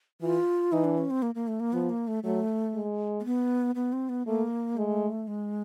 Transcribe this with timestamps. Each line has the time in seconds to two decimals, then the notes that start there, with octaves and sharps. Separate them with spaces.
0.21 E3 F4
0.72 E3 D#4
0.84 D4
0.98 C#4
1.10 C4
1.22 A#3
1.35 A#3
1.48 A3
1.60 A#3
1.73 F3 B3
1.89 A#3
2.08 A3
2.23 F#3 A3
2.75 G#3
3.20 A#3
3.25 B3
3.75 B3
3.93 C4
4.09 B3
4.27 A3 A#3
4.76 G#3 A3
5.28 G#3